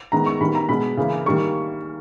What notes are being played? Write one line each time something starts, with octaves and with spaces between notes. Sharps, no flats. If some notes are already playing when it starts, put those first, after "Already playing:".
D#3 G#3 B3 A#5
C#6
D#3 G3 B3 B5
A#5
B2 G#3 B3 B5
C#3 E3 A#3
D#3 G3 A#3 C#6